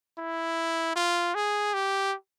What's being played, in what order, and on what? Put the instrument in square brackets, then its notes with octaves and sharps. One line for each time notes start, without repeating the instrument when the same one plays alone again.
[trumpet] E4
F4
G#4
G4